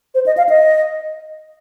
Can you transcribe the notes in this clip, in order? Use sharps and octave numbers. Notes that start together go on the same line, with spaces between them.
C5
D#5
F5
D#5